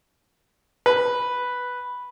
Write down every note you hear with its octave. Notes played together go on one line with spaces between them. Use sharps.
B4